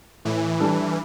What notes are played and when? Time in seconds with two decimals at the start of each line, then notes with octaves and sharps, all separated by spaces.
0.25 A2 E3
0.60 G3 D4 A4